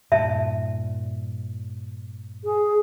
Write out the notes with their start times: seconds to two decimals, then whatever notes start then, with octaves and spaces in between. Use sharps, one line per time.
0.12 G2 A#2 E5 A5
2.44 G#4